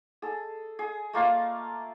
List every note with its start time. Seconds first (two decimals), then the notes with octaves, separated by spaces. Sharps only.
0.22 G#4 A4
0.79 G#4
1.13 A3 A#3 F4 F5